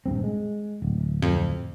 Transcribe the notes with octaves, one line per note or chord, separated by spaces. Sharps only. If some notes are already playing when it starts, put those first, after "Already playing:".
D#1 G2 C4
G#3
D1
F2